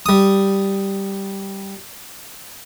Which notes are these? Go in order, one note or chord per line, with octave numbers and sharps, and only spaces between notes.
G3 D#6